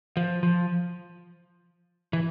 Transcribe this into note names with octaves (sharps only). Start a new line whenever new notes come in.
F3
F3
E3